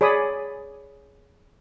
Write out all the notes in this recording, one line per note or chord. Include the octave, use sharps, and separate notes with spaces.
G#4 C#5 D5 B5 D#6